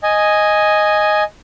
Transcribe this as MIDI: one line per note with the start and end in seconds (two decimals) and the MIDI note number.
0.03 1.24 75
0.03 1.24 80